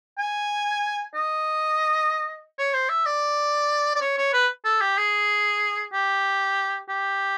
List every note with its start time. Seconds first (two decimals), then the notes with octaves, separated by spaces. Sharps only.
0.19 G#5
1.15 D#5
2.59 C#5
2.74 C5
2.90 E5
3.06 D5
3.96 D5
4.02 C#5
4.18 C#5
4.33 B4
4.65 A4
4.81 G4
4.98 G#4
5.93 G4
6.89 G4